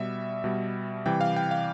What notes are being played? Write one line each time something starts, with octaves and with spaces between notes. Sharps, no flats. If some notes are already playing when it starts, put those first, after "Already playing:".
Already playing: B2 G3 E5
B2 G3
C3 E3 G3 G5
F5
G5
F5